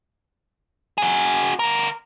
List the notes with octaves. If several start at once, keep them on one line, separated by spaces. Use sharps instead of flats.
F#4 G#4
D3 A#4